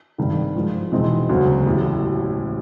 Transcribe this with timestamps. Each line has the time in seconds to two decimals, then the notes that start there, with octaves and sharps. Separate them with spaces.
0.18 G#1 G2 D#3
0.55 G#2 F3 G#3
0.92 E2 B2 G#3 C4 D#4
1.29 E1 D2 C#3 F#3
1.66 A1 A2 F#3